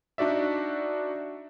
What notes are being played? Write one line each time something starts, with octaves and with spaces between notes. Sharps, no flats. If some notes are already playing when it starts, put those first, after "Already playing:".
D4 D#4 F#4 D5 E5